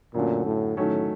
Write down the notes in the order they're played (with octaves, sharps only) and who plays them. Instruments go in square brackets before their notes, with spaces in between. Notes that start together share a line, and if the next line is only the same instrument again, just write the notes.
[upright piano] F#2 D3 F#3 A3 [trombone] A#2
[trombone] A2
[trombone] A2 [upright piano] D#3 F#3 A3 C#4